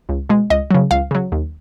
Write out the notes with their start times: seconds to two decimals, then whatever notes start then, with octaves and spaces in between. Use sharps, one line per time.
0.09 C#2
0.29 B2 G#3
0.50 C#2 D#5
0.71 C#3 F#3
0.91 C#2 F5
1.11 C#3 F#3
1.32 D#2